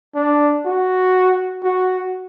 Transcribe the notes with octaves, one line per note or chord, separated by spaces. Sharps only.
D4
F#4
F#4